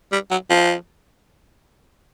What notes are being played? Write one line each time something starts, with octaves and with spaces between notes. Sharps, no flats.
G3
F#3
F3